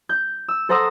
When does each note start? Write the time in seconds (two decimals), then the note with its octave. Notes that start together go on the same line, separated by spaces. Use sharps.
0.09 G6
0.48 E6
0.69 A4 C5 F#5 A#5 D#6 E6